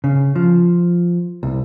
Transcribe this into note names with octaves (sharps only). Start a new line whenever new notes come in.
C#3
F3
C2